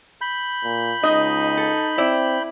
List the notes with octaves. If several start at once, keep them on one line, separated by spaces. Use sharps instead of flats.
B5 G6
A#2
C#2 D#4 D#5
A4
C4 E4 D5